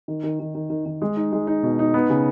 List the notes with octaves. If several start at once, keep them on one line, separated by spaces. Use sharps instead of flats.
D#3
D#3
D#3
D#3
D#3
D#3
G#3
D#4
G#3
D#4
B2
D#4
B3
C#3